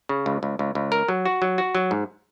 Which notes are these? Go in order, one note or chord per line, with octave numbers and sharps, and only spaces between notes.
C#3
C#2
C#2
C#2
C#2
A#4
F#3
F#4
F#3
F#4
F#3
G#2